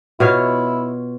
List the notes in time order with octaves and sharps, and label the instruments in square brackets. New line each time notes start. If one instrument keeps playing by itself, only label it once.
[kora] B2 F4 C#5 [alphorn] E4